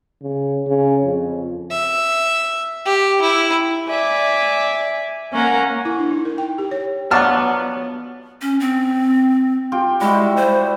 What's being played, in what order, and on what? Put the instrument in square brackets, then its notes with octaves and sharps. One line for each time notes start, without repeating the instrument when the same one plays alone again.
[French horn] C#3
C#3
F2
[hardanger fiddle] E5
G4
E4
[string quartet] D5 E5 G#5
A#3 C#4 A#4 F#5
[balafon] E4
D4
D#4
A#4
G5
G4
C#5
[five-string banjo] F3 F#5 [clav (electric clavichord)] F#3 D4 [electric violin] B3 [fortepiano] A5 F6
[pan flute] C#4
C4
[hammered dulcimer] F4 G4 G5
[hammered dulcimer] G3 E4 F#4 [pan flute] G#3
[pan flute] C5